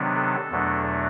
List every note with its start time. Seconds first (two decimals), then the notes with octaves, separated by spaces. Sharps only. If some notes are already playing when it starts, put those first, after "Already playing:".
Already playing: C3 D#3 F#3 B3 D4
0.15 A4
0.50 E2 B2 F#3 A3 D4